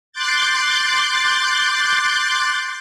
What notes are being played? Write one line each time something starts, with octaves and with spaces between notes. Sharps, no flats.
C6 D6 F#6 G6 A6